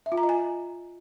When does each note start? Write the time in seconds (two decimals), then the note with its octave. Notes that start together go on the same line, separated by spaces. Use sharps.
0.06 E5
0.12 F4
0.18 A#5
0.23 D#5
0.29 G#5